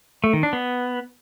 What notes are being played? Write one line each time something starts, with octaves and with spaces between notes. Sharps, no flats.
A3
D#3
D4
B3